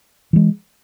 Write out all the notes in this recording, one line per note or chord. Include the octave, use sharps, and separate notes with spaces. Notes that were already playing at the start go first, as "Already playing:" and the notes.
E3 G#3